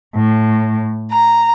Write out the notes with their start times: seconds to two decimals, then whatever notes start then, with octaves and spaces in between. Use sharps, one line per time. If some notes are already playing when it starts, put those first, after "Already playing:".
0.15 A2
1.12 A#5